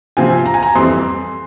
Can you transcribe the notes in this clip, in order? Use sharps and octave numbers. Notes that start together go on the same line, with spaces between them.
C3 F3 C4 F4 G#5
A#5
G#5
A#5
F2 E3 G3 C4 C6